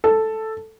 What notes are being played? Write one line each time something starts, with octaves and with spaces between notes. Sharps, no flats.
A4